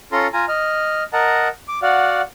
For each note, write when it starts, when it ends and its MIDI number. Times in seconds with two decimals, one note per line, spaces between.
0.12 0.27 61
0.12 0.27 65
0.12 0.27 69
0.12 0.27 82
0.12 0.27 84
0.33 0.45 65
0.33 0.45 80
0.33 0.45 82
0.48 1.03 75
0.48 1.03 89
1.13 1.48 70
1.13 1.48 75
1.13 1.48 78
1.13 1.48 81
1.13 1.48 82
1.68 1.80 86
1.82 2.22 66
1.82 2.22 74
1.82 2.22 77
1.82 2.22 78